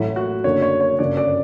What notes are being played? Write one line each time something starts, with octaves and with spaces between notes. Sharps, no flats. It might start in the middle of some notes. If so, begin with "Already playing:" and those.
Already playing: A1 A2 F#3 A3 E4
F#4
F#1 F#2 D3 C#5
C#5
C#5
G1 F#2 C#3 D5
D5